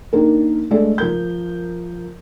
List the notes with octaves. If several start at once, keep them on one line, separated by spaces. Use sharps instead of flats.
D#3 A#3 D4 A#4
G#3 A3 D4 A4 D5
F3 A#4 G6